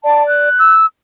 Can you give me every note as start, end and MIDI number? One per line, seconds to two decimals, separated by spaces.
0.04 0.49 74
0.04 0.23 81
0.27 0.74 90
0.59 0.85 88